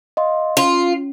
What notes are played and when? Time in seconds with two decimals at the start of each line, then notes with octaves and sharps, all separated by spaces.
0.17 D#5 F5 C6
0.57 C#4 F4